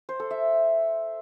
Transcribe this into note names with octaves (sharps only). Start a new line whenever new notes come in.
C5
A4
E5